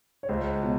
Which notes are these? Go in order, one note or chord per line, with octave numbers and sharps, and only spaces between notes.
C#5
C#2 C5
B2